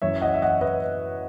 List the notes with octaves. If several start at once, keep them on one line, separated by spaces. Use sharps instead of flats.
F#2 E3 C#5 E5
D#5 F#5
E5
D#5 F#5
B4 D#5